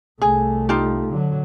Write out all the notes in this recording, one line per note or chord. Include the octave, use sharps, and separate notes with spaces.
C2 A3 G#4
D#4 F4 G4
D3 F#3